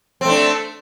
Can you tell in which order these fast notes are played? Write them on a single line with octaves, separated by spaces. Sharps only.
C4 A3 D4